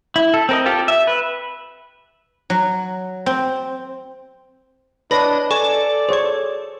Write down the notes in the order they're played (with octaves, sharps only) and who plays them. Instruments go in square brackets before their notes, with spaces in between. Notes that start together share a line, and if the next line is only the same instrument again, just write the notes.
[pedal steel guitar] E4
A4
C4 A#4 D#5
F4 G4 A4
E5
B4
[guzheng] F#3
C4
[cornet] D4 [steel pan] B4 C#5 [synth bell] D#5 [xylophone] B5 A#6
[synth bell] A4 [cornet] D5 [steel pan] G#5 [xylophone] C#6
[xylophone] G#4 C#6 [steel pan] C5 C#5